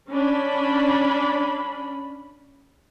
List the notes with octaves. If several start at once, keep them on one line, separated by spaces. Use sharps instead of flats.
C#4 D4 B5